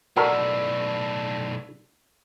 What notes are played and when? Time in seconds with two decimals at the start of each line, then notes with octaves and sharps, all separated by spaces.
0.17 B1 A2 F#4 A4 A#4 D5 E6 B6